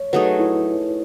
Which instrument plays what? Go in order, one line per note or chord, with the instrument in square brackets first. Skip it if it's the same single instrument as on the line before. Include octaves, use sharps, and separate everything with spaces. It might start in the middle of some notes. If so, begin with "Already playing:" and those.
Already playing: [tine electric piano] C#5
[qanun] F#3 A3 D#4 G#4 [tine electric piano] B4
[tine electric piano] E4